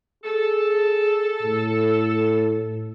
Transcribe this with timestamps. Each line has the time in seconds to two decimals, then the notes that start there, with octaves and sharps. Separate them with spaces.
0.24 G#4 A4
1.43 A2